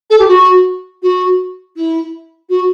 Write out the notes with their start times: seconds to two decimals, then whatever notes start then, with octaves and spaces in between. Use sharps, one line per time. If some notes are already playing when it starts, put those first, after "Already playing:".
0.10 A4
0.19 G4
0.28 F#4
1.02 F#4
1.76 E4
2.49 F#4